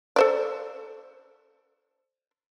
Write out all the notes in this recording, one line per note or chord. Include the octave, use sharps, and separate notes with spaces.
A4 C5 D5